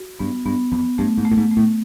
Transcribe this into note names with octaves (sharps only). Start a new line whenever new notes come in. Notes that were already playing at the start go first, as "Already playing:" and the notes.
Already playing: F#4
G2 B3
G2 B3
F2 B3
G2 A3
G#2
A3
A2
G#2
A3
A2